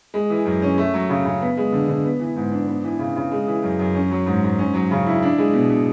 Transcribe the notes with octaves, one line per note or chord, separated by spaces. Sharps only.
G#3
E3
F#2
C#4
A3
F#3
C#3
C#3
B3
G#3
D3
D3
B3
E3
G#2
D4
B3
E3
C#3
C#3
G#3
E3
F#2
F#2
C#4
F#3
G#2
G#2
C#4
F#3
C#3
E4
D4
G#3
B2
B2